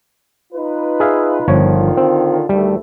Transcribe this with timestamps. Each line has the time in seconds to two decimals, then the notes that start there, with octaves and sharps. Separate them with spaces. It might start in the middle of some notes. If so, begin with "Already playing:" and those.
0.53 D#4 F4 B4
1.00 G#4 E5 F5
1.48 G1 D3 D#3 F3 F4 C#5
1.97 C4
2.49 D2 D#3 G3 A3